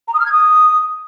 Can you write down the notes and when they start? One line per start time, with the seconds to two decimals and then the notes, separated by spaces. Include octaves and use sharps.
0.08 A#5
0.14 D#6
0.20 F6
0.26 G#6
0.32 D#6